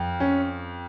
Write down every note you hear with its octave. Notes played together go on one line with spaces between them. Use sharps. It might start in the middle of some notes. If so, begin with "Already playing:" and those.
Already playing: F2
C#4